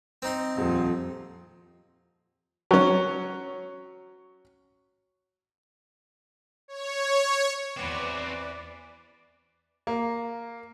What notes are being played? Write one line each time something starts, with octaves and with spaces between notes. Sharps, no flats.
C4 D#4 C6
D#1 F2
F#3 C#4
C#5
E2 E3 C4 F#4 B4 D5 D6
A#3